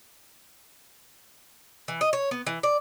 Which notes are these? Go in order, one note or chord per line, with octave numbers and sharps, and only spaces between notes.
E3
D#5
C#5
B3
E3
D5